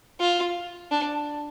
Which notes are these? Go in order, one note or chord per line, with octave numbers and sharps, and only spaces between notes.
F4
D4